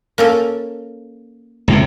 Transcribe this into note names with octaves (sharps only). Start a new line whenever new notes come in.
A#3 C#4 A4
C#2 A2 C3